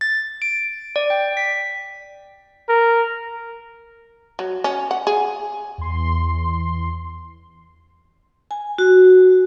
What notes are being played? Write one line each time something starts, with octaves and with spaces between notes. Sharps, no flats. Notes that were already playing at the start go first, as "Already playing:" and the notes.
A6
D7
D5
G5
B6
A#4
F#3
C#4
F#5
G#4
E2 C6
G#5
F#4